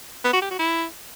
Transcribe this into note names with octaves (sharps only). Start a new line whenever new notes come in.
B3
F#4
G4
F#4
E4